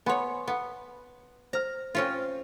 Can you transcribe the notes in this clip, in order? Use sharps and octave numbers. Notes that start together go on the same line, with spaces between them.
B3 C#5 G#5 B5 C6
B3
C5 A#5 F6
C4 C#4 F4